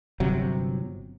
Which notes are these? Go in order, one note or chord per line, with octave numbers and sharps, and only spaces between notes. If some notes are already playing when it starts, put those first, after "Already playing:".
G1 C3 F#3